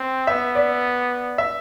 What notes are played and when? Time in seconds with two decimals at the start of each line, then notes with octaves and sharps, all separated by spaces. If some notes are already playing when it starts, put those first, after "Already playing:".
Already playing: C4
0.27 B3 E5
0.55 D5
1.38 E5